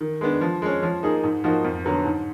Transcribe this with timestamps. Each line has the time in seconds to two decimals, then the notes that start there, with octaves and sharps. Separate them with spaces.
0.01 D#3
0.21 G#3 B3 D4
0.41 F3
0.62 G#3 C#4
0.83 F3
1.03 A#3 D#4 G#4
1.24 G#2
1.44 F3 A#3 D#4 F#4
1.64 F2
1.85 D3 F#3 B3
2.05 G#2